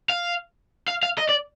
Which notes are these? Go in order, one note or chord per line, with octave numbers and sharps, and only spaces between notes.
F5
F5
F5
D#5
D5